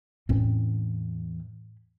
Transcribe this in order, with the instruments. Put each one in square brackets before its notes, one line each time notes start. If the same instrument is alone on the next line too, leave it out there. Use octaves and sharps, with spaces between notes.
[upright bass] E2 [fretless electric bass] A2 C4 C#4